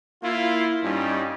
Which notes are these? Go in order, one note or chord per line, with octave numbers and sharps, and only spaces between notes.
A#3 E4 F4
G2 G3 C#4 D#4